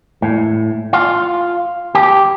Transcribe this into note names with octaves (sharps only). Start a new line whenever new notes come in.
A2
F4
G4